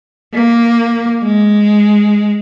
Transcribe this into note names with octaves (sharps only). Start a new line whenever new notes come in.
A#3
G#3